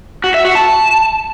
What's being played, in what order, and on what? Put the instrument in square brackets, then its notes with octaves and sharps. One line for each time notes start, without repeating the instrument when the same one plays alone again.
[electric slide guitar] F#4
E5
F#4
A5